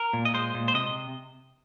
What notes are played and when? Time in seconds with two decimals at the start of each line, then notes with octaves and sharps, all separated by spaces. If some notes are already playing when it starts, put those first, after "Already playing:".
Already playing: A#4
0.13 A#2
0.25 D#5
0.34 G#3 C5
0.54 A#2
0.68 C5
0.74 C3 D#5